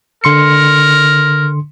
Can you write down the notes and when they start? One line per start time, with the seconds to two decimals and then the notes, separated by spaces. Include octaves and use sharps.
0.24 D3 A#4 C6 C#7